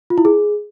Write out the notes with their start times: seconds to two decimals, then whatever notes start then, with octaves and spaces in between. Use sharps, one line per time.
0.10 F4
0.18 E4
0.25 G#4